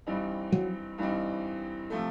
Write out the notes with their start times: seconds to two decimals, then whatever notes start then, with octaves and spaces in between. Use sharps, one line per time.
0.07 G2 E3 G3 C4 D#4
0.52 F#3
0.98 G2 E3 G3 C4 D#4
1.90 C3 F3 A3